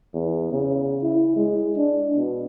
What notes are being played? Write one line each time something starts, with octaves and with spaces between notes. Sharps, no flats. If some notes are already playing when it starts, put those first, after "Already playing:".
E2
C#3
E4
G#3
D4
B2